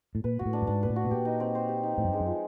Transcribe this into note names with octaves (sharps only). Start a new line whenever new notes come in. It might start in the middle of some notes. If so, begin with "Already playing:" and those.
A2
A#2 B4
A#2 F#4
A2
D4
G2
G#2 D4
A#2 B4
A2
F#4
B2
A#2 G4
D#4
C4
C5
G4
D#4
A2 C4
F#2
G2 G#3
F#2
F3